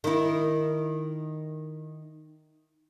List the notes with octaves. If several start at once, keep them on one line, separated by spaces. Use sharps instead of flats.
D#3 E4